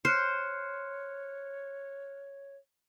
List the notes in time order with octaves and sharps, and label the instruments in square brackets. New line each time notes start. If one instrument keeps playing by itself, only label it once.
[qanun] C5 [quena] C#5 [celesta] F6 F#6 C#7